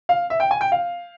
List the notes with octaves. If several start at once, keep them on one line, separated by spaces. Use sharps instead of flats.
F5
E5
G5
G#5
G5
F5